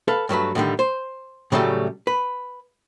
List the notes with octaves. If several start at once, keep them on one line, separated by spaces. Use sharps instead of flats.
A4 B4 F5
G2 F#3 A3 B4
A2 D3 D#3 G3
C5
A2 C#3 F#3 G3 A3
B4